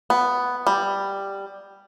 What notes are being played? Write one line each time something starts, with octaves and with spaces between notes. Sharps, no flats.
B3
G3